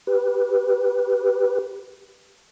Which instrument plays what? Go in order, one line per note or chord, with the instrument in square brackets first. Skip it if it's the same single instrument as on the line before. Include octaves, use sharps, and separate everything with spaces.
[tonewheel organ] G4 B4